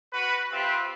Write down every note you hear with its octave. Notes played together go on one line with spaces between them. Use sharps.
F#4 B4
C4 F4 G4 B4 E5